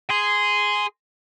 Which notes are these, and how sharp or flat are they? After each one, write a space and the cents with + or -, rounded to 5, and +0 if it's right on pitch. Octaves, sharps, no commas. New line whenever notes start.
G#4 +0 C6 -10